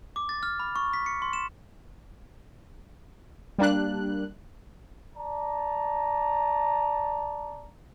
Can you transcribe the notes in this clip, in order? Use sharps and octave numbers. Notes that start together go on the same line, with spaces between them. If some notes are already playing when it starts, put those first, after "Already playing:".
D6
A6
F6
B5
C#6
B6
C#7
C6
E7
G3 A#3 D4 F#6
D5 A5 A#5